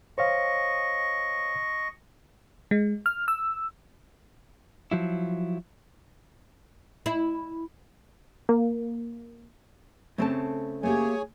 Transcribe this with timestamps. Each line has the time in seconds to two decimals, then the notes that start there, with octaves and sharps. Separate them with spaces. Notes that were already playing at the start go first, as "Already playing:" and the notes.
0.18 C5 C#5 D#5 F5 C#6
2.71 G#3
3.06 F6
3.28 E6
4.92 F3 F#3 E4
7.06 E4
8.49 A#3
10.18 C#3 A3 C4 A4 A5
10.83 A3 A#3 G4 G#4 C#5 G#5